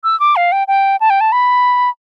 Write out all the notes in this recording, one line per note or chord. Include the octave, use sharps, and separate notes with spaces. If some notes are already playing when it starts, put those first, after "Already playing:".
E6
D6
F5
G5
G5
A5
G5
A5
B5